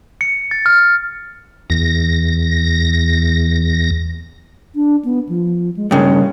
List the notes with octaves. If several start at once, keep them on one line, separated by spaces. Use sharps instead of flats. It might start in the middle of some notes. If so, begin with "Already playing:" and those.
C#7
A6
F6
E2 A#6
D4
B3
F3
G#3
G2 C#3 A#4